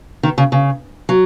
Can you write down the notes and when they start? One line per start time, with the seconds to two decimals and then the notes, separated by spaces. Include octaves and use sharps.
0.23 D#3
0.38 C#3
0.52 C#3
1.09 F#3